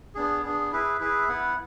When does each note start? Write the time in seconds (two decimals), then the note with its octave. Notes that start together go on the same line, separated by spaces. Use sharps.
0.15 B3 D4 G#4
0.43 B3 D4 G#4
0.72 E4 G#4 B4 E5
1.00 E4 G#4 B4 E5
1.29 B3 E4 B4 F#5